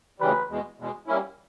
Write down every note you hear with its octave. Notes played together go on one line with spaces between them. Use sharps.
D2 C#3 E3 G3 B4
E2 B2 G#3
E2 B2 G#3
G3 A#3 C#4 E4